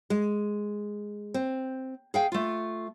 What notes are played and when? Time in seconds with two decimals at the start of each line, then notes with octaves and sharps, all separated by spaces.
0.10 G#3
1.34 C4
2.14 G#4 F5 G5
2.32 A3 F4